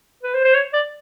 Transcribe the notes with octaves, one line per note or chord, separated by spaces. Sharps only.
B4
C5
C5
C#5
D5